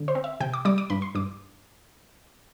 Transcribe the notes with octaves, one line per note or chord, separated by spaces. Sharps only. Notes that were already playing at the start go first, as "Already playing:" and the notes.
Already playing: D3
C5
C4
E5
C3 G5
D6
G3 D6
D6
G2 B5
C6
G2 D6